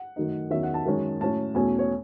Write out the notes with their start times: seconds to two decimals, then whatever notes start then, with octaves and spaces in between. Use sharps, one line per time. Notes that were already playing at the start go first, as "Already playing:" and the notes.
Already playing: F#5
0.16 F#2 D#3 A3 D#4
0.50 E2 D#3 F#3 C#4 E5
0.63 F#5
0.74 A5
0.85 F#2 D#3 G#3 C#4
1.20 A2 F#3 C#4 A5
1.55 E2 B2 A3 C#4 G#5
1.79 C#5